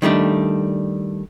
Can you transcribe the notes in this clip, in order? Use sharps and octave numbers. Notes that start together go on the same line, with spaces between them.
D#3 G3 A3 D4